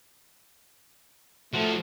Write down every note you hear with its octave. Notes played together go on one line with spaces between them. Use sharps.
F3 A3 F#4